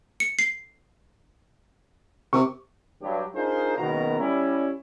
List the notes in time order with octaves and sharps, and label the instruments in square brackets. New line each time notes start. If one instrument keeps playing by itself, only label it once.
[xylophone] C#7
C7
[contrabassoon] C3 [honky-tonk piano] C#6 D6
[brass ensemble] G2 F#3 G4
D4 D#4 F4 G#4 A#4 C5
F#1 B2 D#3 B3 F#4 A#5
G3 C#4 E4